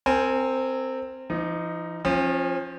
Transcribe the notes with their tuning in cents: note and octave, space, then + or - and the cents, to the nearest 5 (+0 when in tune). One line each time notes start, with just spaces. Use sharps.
C4 +0 A#4 -30 G#5 +0
F3 -45 D#4 +0
F3 +0 C#4 -40